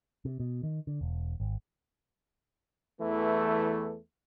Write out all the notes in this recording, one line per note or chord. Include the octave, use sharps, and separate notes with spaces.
C3
B2
D#3
D3
E1
G#1
E2 E3 A3